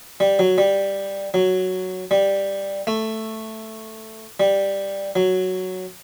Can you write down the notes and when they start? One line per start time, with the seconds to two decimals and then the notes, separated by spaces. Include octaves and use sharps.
0.20 G3
0.39 F#3
0.58 G3
1.34 F#3
2.11 G3
2.87 A3
4.40 G3
5.16 F#3